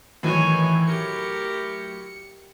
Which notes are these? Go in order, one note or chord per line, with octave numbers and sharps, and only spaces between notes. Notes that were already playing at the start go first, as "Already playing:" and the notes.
A2 D#3 E3 F#3 C#5 G#5
G4 A#4 C#7